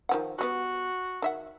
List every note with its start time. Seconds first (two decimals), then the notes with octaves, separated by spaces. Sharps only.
0.09 D#3 F3 F#5
0.39 G3 G#3 B3 F#4
1.22 D#3 E5 F#5